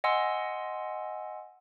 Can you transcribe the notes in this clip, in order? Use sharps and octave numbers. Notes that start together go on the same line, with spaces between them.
D#5 F#5 G#5 C6 E6